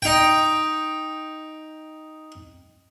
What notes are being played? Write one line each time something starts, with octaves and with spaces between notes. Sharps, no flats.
D#4 G5